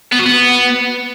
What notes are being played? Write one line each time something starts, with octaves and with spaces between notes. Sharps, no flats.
B3
F#4
B3